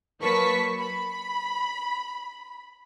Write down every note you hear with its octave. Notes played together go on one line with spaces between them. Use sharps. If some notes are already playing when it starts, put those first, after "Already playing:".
F#3 A#3 B4 A5 C#6 B6
B5